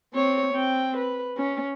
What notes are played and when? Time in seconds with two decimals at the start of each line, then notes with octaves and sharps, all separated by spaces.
0.14 C4 C#5
0.53 C4 G5
0.97 B4
1.37 C#4